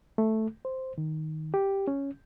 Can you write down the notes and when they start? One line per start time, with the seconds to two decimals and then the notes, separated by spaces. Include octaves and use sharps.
0.18 A3
0.65 C5
0.98 D#3
1.54 G4
1.88 C#4